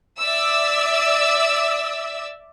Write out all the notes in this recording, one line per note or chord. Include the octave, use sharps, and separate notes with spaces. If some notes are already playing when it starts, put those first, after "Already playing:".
D5 E5 E6